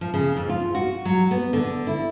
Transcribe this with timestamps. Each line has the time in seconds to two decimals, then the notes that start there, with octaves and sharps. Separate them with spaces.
0.01 F3
0.14 C#3
0.36 F2
0.49 F4
0.75 F#4
1.05 F#3
1.31 B3
1.53 D3
1.87 E4